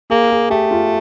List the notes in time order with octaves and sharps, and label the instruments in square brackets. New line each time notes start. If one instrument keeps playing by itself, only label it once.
[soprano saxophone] A#3 [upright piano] G#4
[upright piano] G#4
[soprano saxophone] A3 [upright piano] G4
[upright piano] F4